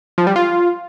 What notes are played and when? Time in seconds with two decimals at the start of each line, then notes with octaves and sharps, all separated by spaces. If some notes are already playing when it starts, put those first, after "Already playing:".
0.18 F3
0.27 G3
0.36 F4